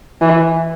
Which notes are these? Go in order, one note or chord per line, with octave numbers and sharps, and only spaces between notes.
E3